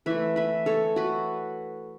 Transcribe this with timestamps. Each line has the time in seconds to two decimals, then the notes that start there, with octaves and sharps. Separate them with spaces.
0.06 E3 A3 B4 E5
0.36 B4 E5
0.66 A4 C#5
0.96 F#4 B4